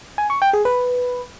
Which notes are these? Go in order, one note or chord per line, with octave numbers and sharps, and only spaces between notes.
G#5
C#6
G5
G#4
B4